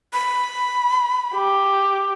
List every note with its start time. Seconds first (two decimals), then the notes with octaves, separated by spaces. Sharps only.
0.13 B5
1.35 G4